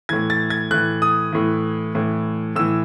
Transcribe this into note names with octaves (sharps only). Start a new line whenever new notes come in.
A2 E3 G#6
A6
G#6
A2 E3 F#6
D#6
A2 E3
A2 E3
A2 E3 E6